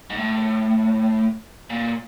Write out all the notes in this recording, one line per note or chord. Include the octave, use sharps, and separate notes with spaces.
G#2
A2
A#2